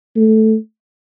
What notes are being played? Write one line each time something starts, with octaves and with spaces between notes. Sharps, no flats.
A3